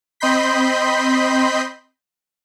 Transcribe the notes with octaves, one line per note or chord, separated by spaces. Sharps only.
C4 D#5 B5 C6 G6 B6